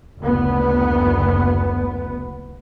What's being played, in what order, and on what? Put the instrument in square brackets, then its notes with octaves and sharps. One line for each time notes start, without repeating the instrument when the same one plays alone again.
[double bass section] F#1 D2 B3